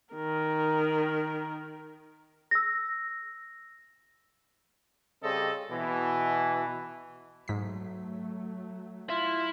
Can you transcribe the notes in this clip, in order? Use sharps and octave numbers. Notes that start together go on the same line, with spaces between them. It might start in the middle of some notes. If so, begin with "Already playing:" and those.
D#3 A#4
E6 A#6
C#3 G3 C4 A4 D#5
B2 E3
G#2 F#3 A3 B6
E4 F4